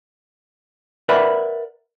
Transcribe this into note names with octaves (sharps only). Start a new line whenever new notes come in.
A#4 B4 D5 E5 F#5 B5